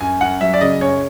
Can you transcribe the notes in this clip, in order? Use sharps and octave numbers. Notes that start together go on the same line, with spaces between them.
F#2 G#5
F#2 F#5
F#3 E5
D5
C#3 D#5
F#2 C#5